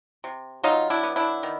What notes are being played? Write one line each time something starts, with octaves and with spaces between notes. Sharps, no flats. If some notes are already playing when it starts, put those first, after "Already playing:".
C3
F#3 D#4 F4
D4 E4
B3
D4 E4
D#3